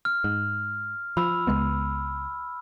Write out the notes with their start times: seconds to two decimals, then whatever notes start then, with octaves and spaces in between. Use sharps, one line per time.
0.05 F6
0.24 G#2
1.17 F3 B5 E6
1.47 C#2 G#3 B3